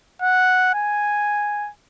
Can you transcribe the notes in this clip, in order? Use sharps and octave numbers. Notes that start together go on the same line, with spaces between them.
F#5
G#5